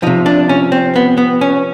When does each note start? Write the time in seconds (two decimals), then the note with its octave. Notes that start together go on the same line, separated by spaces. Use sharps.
0.03 C3 F3 D#4
0.26 D4
0.49 C#4
0.72 C4
0.96 B3
1.18 B3
1.41 C#4